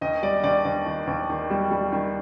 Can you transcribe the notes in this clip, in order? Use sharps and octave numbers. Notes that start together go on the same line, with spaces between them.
D#2 D#5
G3 D5
D#2 D5
D#2
D#3
D#2
D#3
G3
G3
D#3